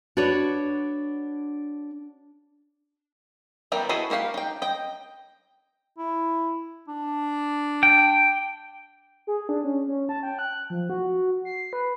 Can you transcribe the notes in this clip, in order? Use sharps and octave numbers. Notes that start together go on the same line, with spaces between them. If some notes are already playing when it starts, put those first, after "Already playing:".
D4 F#4 B4 C#5 D5
E3 G3 B3 A#4 G5
E4 F#4 G#4 A4 D#5
A#3 F#4 G4 F5 B5
D#4 G5
D#5 G5
E4
D4
G5
G#4
D4
C#4
C#4
A5
G5
F#6
F3
F#4
C7
B4